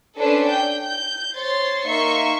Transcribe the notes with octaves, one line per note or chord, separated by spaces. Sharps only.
C#4 D4 A4 B4 C5
G5 G6
G6
C5 C#5 C6 A6
A#3 D#4 E5 C6 C#6